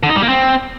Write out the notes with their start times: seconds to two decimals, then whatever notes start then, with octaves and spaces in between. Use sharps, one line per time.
0.03 D3
0.09 D#4
0.16 G3
0.22 A#3
0.29 C4